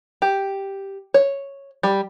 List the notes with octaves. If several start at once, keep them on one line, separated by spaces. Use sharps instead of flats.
G4
C#5
G3